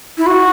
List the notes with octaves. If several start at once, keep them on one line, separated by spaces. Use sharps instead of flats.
E4
F#4